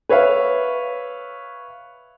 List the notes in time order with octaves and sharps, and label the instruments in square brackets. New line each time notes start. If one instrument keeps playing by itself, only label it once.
[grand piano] B4 C#5 E5 F5